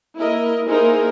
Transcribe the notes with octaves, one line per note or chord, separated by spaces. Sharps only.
A#3 E4 A#4 D#5
A#3 D#4 E4 G#4 A#4 C5